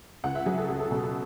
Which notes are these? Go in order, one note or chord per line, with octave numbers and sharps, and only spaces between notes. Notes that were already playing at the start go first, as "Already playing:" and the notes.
C#2 F#5
E5
F#3 G#4
A4
C#2 G#4
A4
B2 A4
A4